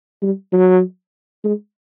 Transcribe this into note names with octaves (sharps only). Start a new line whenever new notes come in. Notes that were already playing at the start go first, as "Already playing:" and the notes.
G3
F#3
G#3